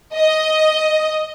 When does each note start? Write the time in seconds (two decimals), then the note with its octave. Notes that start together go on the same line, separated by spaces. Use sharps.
0.14 D#5